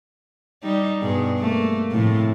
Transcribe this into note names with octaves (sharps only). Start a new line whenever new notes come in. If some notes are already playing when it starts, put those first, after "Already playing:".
G3 D#4
G2 B2 G#4
A3 A#3
A2 C3 F3